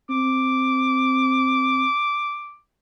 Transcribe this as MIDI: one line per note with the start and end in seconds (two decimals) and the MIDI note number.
0.10 1.86 60
0.10 2.58 86